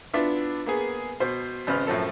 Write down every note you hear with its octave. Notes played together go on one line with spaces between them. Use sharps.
B3 D4 E4 F4 E5
A#3 B3 G#4
B2 C5
G#1 C#3 C4 B4 F6
F#2 A2 F3 A4